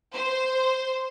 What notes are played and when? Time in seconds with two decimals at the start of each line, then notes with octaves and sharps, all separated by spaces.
0.12 C5